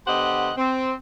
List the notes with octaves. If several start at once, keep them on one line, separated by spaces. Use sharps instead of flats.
D3 B3 G4 C5 D#5 F#5
C4